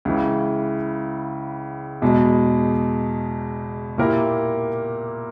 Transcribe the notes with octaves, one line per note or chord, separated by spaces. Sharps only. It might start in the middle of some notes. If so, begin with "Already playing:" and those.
C#2 C#3 E3
E2 B2 G#3
A#2 A#3 E4 G4 A#4